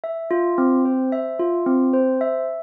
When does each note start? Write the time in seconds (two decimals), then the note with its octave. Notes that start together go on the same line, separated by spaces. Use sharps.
0.04 E5
0.31 F4
0.58 C4
0.85 C5
1.12 E5
1.39 F4
1.66 C4
1.93 C5
2.21 E5